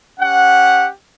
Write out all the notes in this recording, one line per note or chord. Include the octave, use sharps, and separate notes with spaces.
C#4 G4 F#5